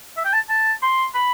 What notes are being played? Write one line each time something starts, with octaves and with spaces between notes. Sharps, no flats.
E5
G5
A5
A5
C6
B5